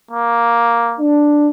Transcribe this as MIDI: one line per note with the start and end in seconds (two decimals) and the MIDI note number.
0.11 1.00 58
0.99 1.50 62